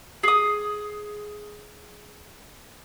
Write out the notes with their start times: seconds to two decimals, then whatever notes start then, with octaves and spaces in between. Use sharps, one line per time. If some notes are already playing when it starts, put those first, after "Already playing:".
0.23 G#4 D#6